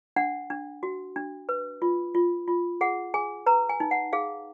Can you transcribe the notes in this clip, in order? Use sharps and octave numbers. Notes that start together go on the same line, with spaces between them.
D4 F#5
D4
F#4
D4
B4
F4
F4
F4
G#4 F#5
G#4 G#5
B4 A#5
G#5
D#4
F#5
G#4 F5